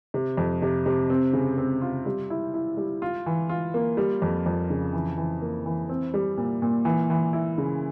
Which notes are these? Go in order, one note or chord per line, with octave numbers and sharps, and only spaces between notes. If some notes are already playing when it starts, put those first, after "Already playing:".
C3
F2
C3
C3
C4
C#3
C4
F4
G3
E4
E4
G3
F4
E3
F4
A#3
G3
F2
F2
C#3
E3
E3
A#3
E3
C4
G3
A#2
A#2
E3
E3
E4
C#3